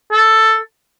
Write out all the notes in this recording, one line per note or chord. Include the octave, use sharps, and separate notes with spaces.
A4